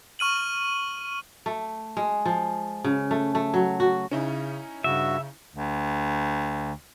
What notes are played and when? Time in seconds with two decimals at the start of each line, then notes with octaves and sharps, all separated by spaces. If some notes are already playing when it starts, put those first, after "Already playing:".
0.19 C#6 F6 D#7 F#7
1.46 A3
1.97 G#3
2.26 F3
2.84 C#3
3.11 A3
3.35 A3
3.54 F#3
3.80 F#4
4.11 C#3 C#4 D#4 E4
4.84 G2 C#3 F#4 E5
5.56 D2